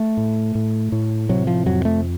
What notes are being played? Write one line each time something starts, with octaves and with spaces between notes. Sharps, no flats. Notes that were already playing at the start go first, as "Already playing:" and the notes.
Already playing: A3
A2
A2
A2
C3 F#3
F3
F2 F#3
A3